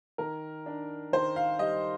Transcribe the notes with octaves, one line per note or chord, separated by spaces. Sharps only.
D#3 A#4
D4
D#3 C5
F5
G3 D#5